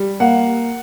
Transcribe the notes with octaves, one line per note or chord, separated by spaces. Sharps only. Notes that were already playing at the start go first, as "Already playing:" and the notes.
Already playing: G3
A#3 F#5